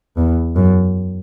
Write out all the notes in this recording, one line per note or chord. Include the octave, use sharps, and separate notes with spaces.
E2
F#2